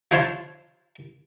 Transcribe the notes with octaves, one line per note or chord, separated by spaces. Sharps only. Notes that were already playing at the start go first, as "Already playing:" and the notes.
F3 C5 C#5 F5 A5 C6